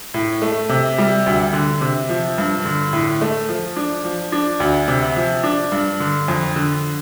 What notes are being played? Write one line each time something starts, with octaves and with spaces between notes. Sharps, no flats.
A2
A3
C3
G3
D2
D3
C3
F3
G2
D3
A2
A3
F3
D4
F3
D4
D2
C3
F3
D4
G2
D3
F2
D3